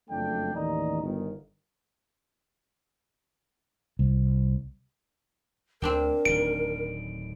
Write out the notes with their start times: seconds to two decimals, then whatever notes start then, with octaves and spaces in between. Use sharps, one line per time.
0.10 F#1 F2 A3 D4 G5
0.55 A1 D#2 D5 D#5 A#5
1.01 G1 D#3
3.99 C2
5.82 D2 C4 D4 A#4 G5
6.25 D1 D3 D#3 D7